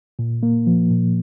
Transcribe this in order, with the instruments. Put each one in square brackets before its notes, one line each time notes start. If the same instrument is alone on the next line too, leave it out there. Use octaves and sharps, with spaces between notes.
[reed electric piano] A#2
A#3
F3
A#2